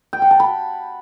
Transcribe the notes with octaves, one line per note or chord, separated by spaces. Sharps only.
G5
F#5
A5
B5